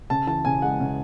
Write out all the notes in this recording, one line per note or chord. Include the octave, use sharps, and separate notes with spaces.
C#3 A5
E3 A5
C#3 G#5
G#3 F#5
C#3